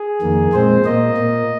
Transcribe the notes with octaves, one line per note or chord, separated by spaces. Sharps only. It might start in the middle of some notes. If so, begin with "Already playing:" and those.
Already playing: G#4
F2 D#3 A#3
A#2 G#3 C4 C5
A#2 A#3 D#5
A#2 A#3